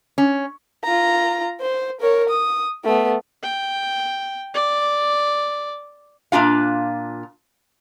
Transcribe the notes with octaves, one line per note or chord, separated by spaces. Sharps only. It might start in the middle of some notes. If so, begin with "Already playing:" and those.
C#4
F4 A#5
C5
A#4 C#5
D#6
A3 B3
G5
D5
A#2 D4 F4 F5